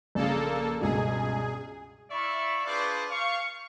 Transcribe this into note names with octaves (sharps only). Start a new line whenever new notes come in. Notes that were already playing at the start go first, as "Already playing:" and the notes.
A#1 C#3 A#3 G#4 A4
C#2 G2 B2 G#4
E4 D5 E5 F5 B5 C#6
D4 F4 G#4 B4 C5 D5
F5 C#6